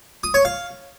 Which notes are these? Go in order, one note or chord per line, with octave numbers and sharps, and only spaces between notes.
D#6
C#5
F5